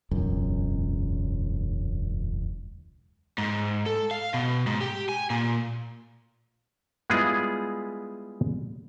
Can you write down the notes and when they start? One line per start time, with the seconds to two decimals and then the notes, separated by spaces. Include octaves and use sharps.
0.11 E1 C#2 F#2
3.38 G#2
3.86 A4
4.11 F5
4.34 B2
4.67 G#2
4.81 G4
5.09 G#5
5.30 A#2
7.10 G3 G#3 B3 E4 F4 G#4